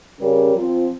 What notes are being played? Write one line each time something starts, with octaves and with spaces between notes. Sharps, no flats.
C#3 G3 C#4 G4 A#4
F3 C4 F4